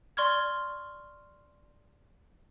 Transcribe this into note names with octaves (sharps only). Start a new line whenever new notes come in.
D5 C6 C#6 F6 G#6